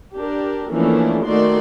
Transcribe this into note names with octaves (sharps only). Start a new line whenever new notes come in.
D4 G4 A#4
E3 F3 A3 A#3 C#4 D4
D#3 A3 A#3 F#4 D5 C6